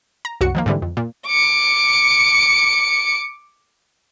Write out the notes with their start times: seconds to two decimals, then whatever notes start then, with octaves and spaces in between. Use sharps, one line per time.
0.25 A#5
0.41 C2 F#2 F#4 C#7
0.55 D#3 F3 A#3
0.66 G#2 D3 E3 G3
0.82 F2
0.97 A#2
1.27 D6 C#7